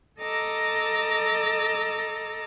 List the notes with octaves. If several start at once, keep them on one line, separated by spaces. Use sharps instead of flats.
A4 D#5 A#5 D6 E6